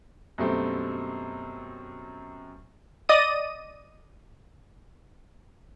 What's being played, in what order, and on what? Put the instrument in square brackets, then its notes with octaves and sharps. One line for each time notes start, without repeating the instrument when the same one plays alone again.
[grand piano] F#2 B2 G3 A3 C4
[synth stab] D5 D#5 D#6 D#7